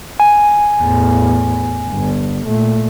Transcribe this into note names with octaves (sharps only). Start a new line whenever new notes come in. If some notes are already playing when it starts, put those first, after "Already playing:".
G#5
E2 A2
G1 G2
A#2 A3